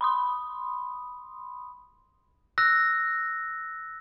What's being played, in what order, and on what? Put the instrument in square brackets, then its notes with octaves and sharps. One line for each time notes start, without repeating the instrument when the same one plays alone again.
[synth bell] B5 C6 D#6
[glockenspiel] E6 F#6 A#6